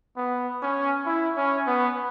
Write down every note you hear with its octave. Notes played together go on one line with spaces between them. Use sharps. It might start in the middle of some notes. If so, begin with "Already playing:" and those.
B3
C#4
E4
C#4
B3